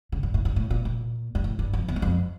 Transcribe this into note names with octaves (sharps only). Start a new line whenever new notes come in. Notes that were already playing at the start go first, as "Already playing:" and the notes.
C#3
G2
A2
G2
A2
A#2
A#2
G2
A2
G2
F2
E2
G2
F2